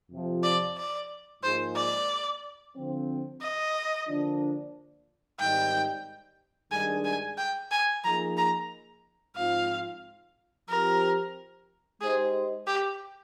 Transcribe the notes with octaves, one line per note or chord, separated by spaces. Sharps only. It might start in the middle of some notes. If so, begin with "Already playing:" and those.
F2 C3 F3
D5
D5
G#2 F3 A#3 D#4 G#4 C5
D5
D3 F3 C4
D#5
D3 F3 A#3 D4
G#2 D#3 G3 C4 D#4 G5
G2 D#3 G#3 D4 G#4 G#5
G#5
G5
G#5
F3 A#3 D#4 G#4 A#5
A#5
G#2 F3 C4 F4 F5
F3 C4 G4 A#4
G#3 D#4 G4 G#4 C5 D#5
G4